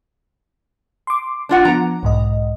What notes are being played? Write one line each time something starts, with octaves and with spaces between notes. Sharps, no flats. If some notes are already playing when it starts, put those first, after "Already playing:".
C6 D6
D4 F4 F#5
F3 B3 A#5
B1 G#2 D#5